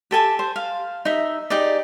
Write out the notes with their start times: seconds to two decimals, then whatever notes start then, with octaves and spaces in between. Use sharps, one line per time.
0.11 G4 A4 G#5 A5
0.39 C5
0.56 F5
1.05 D#4 E5
1.50 D#4 G4 G#4 D5